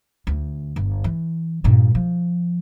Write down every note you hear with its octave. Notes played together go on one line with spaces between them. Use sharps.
D2
G1
E3
G2 A#2
F3